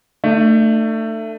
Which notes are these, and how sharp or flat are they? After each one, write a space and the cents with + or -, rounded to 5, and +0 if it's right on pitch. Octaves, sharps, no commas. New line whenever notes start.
A3 +20 D4 +45